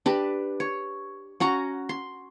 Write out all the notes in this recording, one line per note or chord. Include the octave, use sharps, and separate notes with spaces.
D4 G4 B4
C#5
C#4 F#4 A#5 C#6
C6